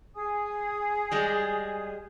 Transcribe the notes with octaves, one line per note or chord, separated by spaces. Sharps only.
G#4 G#5 D#6
G3 G#3